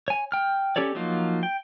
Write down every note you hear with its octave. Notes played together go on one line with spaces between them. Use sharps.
C#5 G#5
G5 F6
C#4 G4 A4 C#5 D5
F3 F#3 A#3 D#4 F4
G5